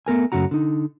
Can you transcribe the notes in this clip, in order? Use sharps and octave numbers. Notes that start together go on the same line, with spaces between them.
A3 B3 A#4 G#5
F#2 C#3 A3 F#4 A#5
D3 D#4